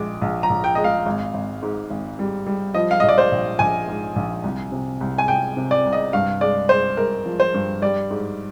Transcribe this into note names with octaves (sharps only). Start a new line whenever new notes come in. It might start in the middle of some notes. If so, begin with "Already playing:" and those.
Already playing: A#1 G#3 D6
A#1
A#5
A#1
G5
G#3 D#5
F5
G#1
G#1
G#2
G#1
G3
G3
F3 D#5
F5
A#1 D#5
D5
C5
A#1
A#1 G#5
G#2
A#1
C2
C3
C2
G#5
C2 G5
C3
D5
C2
D#5
G2 F5
G#3 D5
G#3 C5
G#3 A#4
F3
C5
G2
G3 D5
G#2